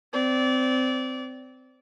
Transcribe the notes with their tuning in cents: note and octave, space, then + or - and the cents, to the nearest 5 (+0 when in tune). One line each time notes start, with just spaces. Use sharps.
C4 -20 D5 -25